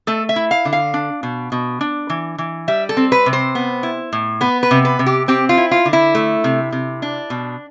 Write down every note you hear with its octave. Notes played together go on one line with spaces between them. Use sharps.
A3 A4
E5
E4
F5
D3
F5
D4
B2
B2
D4
E3
E3
G3 E5
A4
C4
B4
C3
C5
B3
E4
A2
B3 B4
B4
C3
B4
C3
G4
C4 G4
F4
E4
F4
D3
E4
A3
C3
C3
D4
B2